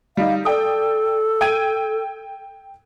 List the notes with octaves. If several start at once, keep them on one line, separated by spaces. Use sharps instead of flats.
G3 D#4 F5
A4 D5 G5 D#6
G5 G#6 D#7